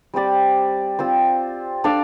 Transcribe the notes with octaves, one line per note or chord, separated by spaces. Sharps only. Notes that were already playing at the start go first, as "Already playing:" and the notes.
G3 C4 G4 D5
C4 F4 C5
D4 A4 D5 F5